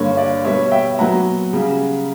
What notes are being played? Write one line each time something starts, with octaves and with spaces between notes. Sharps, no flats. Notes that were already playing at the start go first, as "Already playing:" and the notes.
Already playing: G2 D3 A#3 C#5
D5
B2 G3 B3 C#5 E5
E5 G5
A#2 F#3 B3 F#5 A#5
C#3 G3